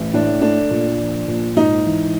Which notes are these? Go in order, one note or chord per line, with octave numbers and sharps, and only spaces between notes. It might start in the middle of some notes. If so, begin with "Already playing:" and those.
Already playing: A1
A2 D4
A3 D4
A#2
F3
A#2
G#2 D#4
E3